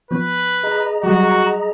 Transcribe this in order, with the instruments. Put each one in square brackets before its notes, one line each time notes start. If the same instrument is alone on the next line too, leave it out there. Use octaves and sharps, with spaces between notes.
[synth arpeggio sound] F3 B3 [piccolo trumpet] B4
[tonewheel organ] G#4 D#5 A#5
[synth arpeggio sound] F#3 G3 [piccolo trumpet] F#4